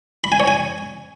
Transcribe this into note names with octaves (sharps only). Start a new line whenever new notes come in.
B5
G#5
C#5
G#5